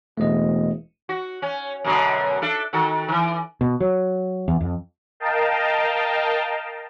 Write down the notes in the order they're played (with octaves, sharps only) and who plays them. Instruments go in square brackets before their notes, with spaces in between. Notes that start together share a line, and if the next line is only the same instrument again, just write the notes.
[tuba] E1 [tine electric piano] A3 D#5
[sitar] F#4
C#4
F#2 B2 D3
D4 A4 E5
D#3 F#4 A4
D#3 E3
[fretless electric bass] B2
F#3
E2
F2
[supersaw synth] A#4 D#5 F5 G5 A5